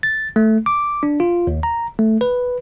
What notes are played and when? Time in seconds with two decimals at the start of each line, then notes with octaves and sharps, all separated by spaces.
0.03 A6
0.36 A3
0.66 D6
1.03 D4
1.20 F4
1.47 D#2
1.63 A#5
1.99 A3
2.21 B4